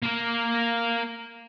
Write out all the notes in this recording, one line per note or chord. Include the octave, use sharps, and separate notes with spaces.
A#3 A#4